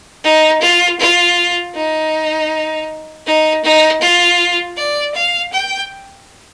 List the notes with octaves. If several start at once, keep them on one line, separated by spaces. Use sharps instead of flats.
D#4
F4
F4
D#4
D#4
D#4
F4
D5
F5
G5